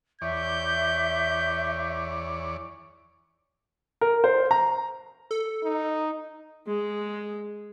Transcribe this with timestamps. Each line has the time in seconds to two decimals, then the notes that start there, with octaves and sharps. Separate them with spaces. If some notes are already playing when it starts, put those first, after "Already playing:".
0.22 E2 C#5 D5 E5 G6
4.01 A#4
4.24 C5
4.51 A#5
5.31 A4
5.64 D#4
6.66 G#3